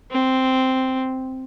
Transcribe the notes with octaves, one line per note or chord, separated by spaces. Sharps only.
C4